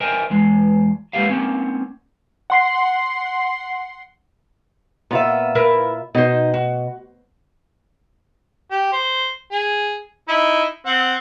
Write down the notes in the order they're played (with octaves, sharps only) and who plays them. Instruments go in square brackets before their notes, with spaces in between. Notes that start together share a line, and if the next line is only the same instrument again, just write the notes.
[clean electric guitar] A#4 C5 D#5 E5 G5 G#5
E2 G#3
G#3 A#3 B3 G4 E5 F5
A#3 C4 C#4
[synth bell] F#5 C6 C7
[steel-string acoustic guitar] A#2 F4 E5 [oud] B3
[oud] E4 A#4 B4
[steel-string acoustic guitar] B2 [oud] D#4 C5
[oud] F#4
[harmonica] G4
C5
G#4
D#4 E4
C4 F#5